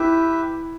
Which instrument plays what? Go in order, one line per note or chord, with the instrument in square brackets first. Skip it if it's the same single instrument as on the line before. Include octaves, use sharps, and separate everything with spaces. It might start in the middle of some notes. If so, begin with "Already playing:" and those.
Already playing: [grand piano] E4 [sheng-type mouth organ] G4 B4 E5 G5